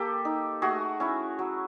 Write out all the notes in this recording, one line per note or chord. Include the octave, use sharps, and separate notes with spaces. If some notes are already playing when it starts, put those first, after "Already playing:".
Already playing: A#3 G4 A4
D#4
A3 F#4 G#4
C#4 E4
F#3